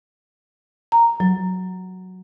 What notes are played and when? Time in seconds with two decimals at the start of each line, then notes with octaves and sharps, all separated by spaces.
0.92 A#5
1.20 F#3